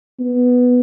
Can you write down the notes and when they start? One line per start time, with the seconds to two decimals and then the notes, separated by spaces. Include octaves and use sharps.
0.20 B3